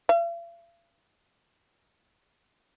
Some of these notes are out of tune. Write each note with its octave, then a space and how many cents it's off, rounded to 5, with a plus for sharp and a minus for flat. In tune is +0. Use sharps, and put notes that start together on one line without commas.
F5 -45